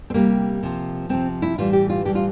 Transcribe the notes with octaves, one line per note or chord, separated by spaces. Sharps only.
C4
C3 G3 A#3
C3 F3
C3 F3 C4
E4
A2 E3 G3 F4
G4
F4
A2 E3 G3 G4
F4